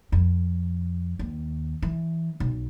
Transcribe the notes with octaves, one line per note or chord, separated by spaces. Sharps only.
F2
D#2
E3
B1